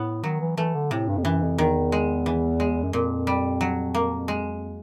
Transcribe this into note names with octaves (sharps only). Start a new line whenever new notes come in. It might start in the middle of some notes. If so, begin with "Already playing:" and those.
Already playing: A2 B3
D#3 F#3
E3
E3 A3
D3
A2 C3
G2
F2
F#2 E3
F2
E2 D#3
G#3
E3
G#3
F#2
F2 A#2
G3
F#3
A#3
G#3